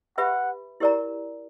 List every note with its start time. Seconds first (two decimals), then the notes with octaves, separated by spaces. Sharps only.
0.18 G4 B4 E5 F#5 B5
0.80 E4 G4 A#4 D5 A#5